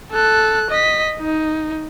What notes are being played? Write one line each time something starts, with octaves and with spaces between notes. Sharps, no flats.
A4 F#6
D#5 B6
D#4